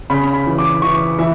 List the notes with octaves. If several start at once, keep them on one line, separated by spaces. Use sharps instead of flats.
C#3 B5
B5
E3
D6
E3 C#6
E3 E5